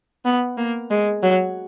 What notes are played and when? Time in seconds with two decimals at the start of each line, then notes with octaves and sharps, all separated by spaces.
0.25 B3
0.57 A#3
0.91 G#3
1.23 F#3